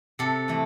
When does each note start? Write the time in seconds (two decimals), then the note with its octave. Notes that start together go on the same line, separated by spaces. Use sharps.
0.19 C3 A4
0.48 E3 A3